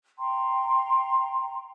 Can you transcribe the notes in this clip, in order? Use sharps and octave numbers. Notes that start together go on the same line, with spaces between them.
G5 A#5 C6